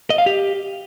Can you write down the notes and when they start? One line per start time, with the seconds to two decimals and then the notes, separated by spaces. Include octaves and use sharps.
0.10 D#5
0.18 F5
0.26 G4